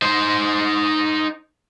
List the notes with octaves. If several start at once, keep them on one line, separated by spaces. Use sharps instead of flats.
D#4 C5